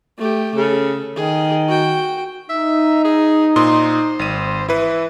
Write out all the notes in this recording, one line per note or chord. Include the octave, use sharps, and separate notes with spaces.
A3 G4
C#3 A4
D#3 G#4
F#4 G5
D#4 E5
G#4
A#2 C5 C6 D#6
G#1 D#7
E3 E4 B4